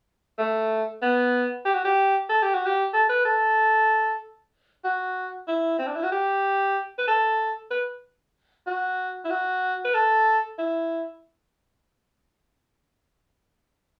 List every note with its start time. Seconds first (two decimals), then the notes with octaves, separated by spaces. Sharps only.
0.38 A3
1.02 B3
1.65 G4
1.75 F#4
1.84 G4
2.29 A4
2.42 G4
2.54 F#4
2.66 G4
2.93 A4
3.09 B4
3.25 A4
4.84 F#4
5.48 E4
5.79 C4
5.87 D4
5.96 E4
6.03 F#4
6.12 G4
6.98 B4
7.07 A4
7.71 B4
8.67 F#4
9.25 E4
9.30 F#4
9.85 B4
9.94 A4
10.58 E4